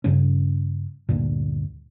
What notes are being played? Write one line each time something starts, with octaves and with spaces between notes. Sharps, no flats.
G2 C#3 G3 C#4
D2 G2 A#2